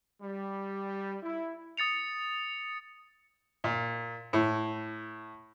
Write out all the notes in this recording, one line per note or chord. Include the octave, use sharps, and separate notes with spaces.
G3
E4
D#6 A6 C#7 F7
A#2
A2